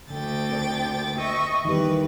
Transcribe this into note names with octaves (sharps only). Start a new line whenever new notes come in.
D2 D3 G5 A6
C4 A#4 D5
D#5 E5 C#6
E2 D#3 G3 G4 B4